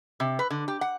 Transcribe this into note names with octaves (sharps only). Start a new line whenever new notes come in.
C3
B4
D3
G4
F#5